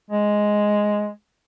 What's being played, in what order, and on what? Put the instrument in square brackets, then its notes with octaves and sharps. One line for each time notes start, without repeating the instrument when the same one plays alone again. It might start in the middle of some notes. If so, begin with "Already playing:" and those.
[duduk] G#3